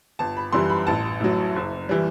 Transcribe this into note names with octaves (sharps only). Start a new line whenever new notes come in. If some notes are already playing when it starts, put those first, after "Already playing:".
G1 A5
B5
F#2 E3 G3 C6
B5
A1 A5
A2 F#3
F#1
E3 G3